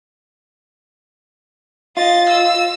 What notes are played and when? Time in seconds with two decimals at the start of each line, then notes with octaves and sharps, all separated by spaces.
1.97 F4 D#5 A6
2.29 E6